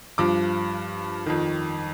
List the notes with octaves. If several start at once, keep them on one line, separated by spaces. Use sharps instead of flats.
G2 F3 D6
F2 D#3